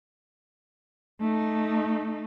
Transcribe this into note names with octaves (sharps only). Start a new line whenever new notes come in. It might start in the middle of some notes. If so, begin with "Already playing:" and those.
A3 D#4